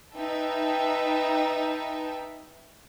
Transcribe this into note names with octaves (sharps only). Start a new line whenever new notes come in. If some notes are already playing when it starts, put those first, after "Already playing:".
D#4 B4 E5 G5 A5